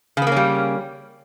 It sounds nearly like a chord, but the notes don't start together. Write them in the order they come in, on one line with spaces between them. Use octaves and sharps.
C#3 B3 A#3 C#4 G3